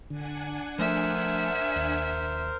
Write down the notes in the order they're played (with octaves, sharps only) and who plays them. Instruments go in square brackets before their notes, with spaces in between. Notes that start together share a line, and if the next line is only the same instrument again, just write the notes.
[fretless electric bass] D3 [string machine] D4 F#5 G#5
[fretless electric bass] F3 A3 [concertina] A#4 C5 [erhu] E5
[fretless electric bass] D#2